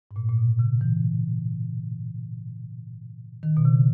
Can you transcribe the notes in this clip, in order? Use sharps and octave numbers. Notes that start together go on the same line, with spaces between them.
G#2
A#2
A#2
B2
C#3
E3
D#3
B2
C#3